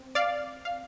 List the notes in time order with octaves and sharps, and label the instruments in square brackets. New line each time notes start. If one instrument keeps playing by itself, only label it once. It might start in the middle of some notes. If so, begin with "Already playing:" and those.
Already playing: [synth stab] C4
D5 F5
F5